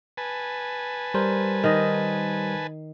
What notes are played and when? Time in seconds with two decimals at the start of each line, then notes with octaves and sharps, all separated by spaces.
0.17 B4 G#5 A5
1.14 G3 A#4 C5
1.64 D#3 D#5